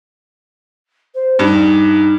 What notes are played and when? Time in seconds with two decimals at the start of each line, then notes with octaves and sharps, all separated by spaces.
1.14 C5
1.39 G2 D#4